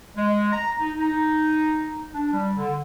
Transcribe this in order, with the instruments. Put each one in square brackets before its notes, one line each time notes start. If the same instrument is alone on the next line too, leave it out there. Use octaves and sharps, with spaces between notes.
[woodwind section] G#3
A#5
D#4
D#4
D4
G3
D3